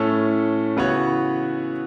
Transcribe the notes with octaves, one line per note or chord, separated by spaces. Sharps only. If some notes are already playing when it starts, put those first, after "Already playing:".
Already playing: A2 A3 C#4 E4 A4
C#3 E3 B3 F#4 C#5